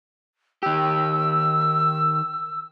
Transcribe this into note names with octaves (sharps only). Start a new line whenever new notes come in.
D#3 G4 E6